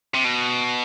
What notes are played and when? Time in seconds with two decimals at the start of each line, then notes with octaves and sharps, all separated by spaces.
0.14 C3
0.25 B2